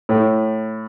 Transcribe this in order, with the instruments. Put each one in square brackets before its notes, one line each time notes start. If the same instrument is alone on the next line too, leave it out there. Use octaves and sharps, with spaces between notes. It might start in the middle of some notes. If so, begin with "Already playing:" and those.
[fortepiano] A2